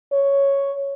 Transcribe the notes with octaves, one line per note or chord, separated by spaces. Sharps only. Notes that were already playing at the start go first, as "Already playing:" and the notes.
C#5